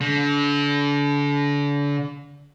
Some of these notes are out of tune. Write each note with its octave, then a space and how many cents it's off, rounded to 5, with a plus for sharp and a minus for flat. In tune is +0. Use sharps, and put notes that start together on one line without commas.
D3 -35